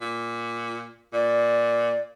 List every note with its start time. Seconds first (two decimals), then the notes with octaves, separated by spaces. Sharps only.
0.01 A#2
1.13 A#2 D5